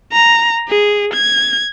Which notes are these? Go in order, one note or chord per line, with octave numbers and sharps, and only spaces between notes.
A#5
G#4
G#6